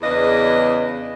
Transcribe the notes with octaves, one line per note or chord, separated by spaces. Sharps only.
E2 C#3 D4 B4 D#5